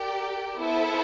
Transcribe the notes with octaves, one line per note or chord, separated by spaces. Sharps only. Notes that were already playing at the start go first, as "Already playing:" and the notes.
Already playing: G4 A#4 D5 G5
B3 E4 A4 C5 E5